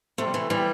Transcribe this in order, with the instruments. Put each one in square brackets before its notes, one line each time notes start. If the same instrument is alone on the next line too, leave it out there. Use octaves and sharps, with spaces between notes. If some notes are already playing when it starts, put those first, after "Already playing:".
[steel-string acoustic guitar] C3 [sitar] A3
[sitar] G3
[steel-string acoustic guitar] E3 [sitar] A3
[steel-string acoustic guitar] E3 [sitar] G3